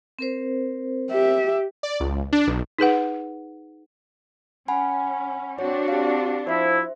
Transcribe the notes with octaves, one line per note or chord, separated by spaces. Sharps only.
C4 A#4 C5
G4 E5
D5
C#2
D4
B1
D#4 G#4 B4 F#5
C#4 F#5 G#5 B5
C4 D4 F#4 C#5
G4 F5
F3 E4 C5 E5